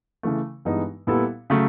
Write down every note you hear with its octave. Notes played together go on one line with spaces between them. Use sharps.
C#3 E3 A3
G2 E3 G#3 B3 D#4
A#2 G3 B3 E4 A4
C#3 F#3 A3